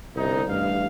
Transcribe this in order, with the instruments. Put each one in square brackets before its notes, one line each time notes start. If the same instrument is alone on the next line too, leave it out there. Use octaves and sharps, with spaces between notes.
[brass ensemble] G1 C2 D#4
A1 G2 F5